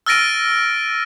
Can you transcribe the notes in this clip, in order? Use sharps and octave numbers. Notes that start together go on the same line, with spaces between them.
E6 F6 A6 A#6 D7 D#7